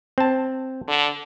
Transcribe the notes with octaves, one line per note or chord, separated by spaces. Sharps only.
C4 A5
D3